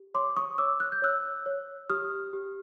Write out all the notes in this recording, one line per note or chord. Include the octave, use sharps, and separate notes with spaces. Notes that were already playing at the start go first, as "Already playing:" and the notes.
Already playing: G4
C#5 C6 D6
C#6 D#6
C#5 D6 E6
F#6
G6
C#5 E6 F#6
C#5
G4 D#6 F6
G4